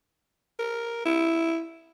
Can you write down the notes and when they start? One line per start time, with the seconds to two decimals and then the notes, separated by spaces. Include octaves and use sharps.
0.59 A#4
1.05 E4